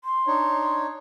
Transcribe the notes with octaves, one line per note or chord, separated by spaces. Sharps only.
C6
D4 D#4 C#5